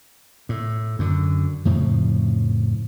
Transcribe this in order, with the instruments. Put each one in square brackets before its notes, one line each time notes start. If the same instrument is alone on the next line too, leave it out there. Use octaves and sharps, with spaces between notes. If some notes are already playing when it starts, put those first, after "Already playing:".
[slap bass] A2
F#2 D3
F2 A2 C#3 F3